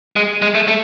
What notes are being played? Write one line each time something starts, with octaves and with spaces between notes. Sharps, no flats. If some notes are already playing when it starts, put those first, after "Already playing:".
G#3
G#3
A3
A3